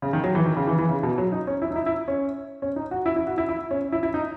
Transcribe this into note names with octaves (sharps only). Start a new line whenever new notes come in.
C#3
D#3
F#3
E3
D#3
C#3
E3
E3
C#3
B2
F#3
D#4
C#4
E4
D#4
E4
E4
C#4
C#4
D#4
F#4
E4
E4
F#4
E4
E4
C#4
E4
E4
D#4